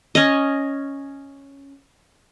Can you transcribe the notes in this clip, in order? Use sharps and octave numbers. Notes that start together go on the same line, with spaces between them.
C#4 D#5